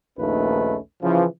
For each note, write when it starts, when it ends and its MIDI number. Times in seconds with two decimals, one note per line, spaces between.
0.19 0.77 34
0.19 0.77 39
0.19 0.77 57
0.19 0.77 61
0.19 0.77 63
0.19 0.77 71
1.03 1.24 49
1.03 1.24 52
1.03 1.24 53